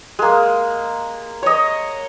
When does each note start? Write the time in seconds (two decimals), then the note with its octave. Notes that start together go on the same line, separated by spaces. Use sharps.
0.19 G#3 A#3
1.43 C#5 D#5